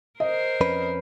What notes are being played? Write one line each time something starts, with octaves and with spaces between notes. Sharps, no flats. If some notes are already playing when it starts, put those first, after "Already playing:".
A#4 C5 D#5
F2 C#4 B4